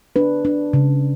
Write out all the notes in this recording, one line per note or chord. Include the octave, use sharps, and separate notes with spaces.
D4 B4
D4
C#3